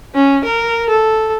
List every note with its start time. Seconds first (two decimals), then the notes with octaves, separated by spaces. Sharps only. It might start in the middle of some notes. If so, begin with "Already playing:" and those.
0.14 C#4
0.45 A#4
0.89 A4